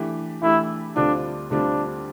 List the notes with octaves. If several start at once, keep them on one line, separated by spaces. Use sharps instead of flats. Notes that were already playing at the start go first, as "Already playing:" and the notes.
Already playing: E3 A3 D4 G4
E3 A3 D4 E4 G4
D2 D3 G3 C4 D4 F4
D2 D3 G3 C4 D4 F4